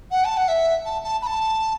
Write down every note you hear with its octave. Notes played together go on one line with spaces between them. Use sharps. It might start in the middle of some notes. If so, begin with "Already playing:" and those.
F#5
A5
F#5
E5
A5
A5
B5
A5